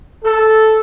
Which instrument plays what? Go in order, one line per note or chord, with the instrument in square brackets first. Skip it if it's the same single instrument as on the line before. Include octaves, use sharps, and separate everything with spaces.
[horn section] A4